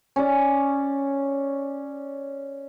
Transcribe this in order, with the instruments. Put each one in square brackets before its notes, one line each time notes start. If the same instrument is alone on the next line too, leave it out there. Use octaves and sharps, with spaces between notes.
[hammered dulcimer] C#4 D5